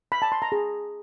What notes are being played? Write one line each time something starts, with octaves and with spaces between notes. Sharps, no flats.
B5
A5
C6
A#5
G#4